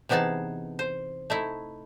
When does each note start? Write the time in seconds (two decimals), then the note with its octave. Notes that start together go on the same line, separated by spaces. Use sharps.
0.09 C3 E3 B3 D#4 G#4 A5
0.79 C5
1.30 A3 D#4 E4